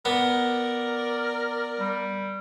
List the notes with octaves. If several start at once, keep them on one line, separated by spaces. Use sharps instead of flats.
B3 A#4 D5
G3